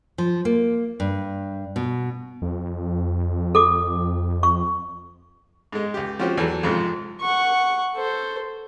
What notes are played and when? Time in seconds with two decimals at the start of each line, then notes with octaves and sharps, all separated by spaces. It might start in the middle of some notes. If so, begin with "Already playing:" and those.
0.18 F3
0.45 A#3
1.00 G2
1.76 B2
2.42 F2
3.55 A4 D6
4.43 C#6
5.72 G#2 G#3
5.94 C#2 G4
6.19 F3 C4 C#4 F#4 G4
6.38 E2 E3 F#3 A4
6.63 F2 G#2 C3 F3
7.20 F#5 C#6
7.95 A4 C5